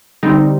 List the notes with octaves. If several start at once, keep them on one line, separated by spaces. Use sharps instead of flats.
D3 G3 C4 D#4